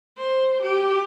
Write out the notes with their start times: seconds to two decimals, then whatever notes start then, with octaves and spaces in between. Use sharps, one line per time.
0.17 C5
0.62 G4